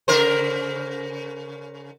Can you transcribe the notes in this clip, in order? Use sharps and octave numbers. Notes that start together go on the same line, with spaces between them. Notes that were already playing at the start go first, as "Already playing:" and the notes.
C#3 A#4 C5